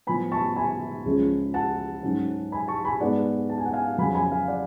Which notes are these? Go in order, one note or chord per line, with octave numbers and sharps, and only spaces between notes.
A2 F3 B3 G#5 B5
A5 C#6
G#5 B5
C#2 C#3 F3 G#3 C#4
F#5 A5
G#2 F#3 C#4
G#5 B5
A5 C#6
G#5 B5
G#2 G#3 B3 D5 F#5
A5
G#5
F#5
F5 G#5
F2 C#3 F#3 G#5 B5
G#5 B5
F5 G#5
D5 F#5